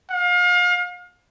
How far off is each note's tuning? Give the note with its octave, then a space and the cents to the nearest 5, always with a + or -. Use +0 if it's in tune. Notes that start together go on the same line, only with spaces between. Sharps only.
F5 +35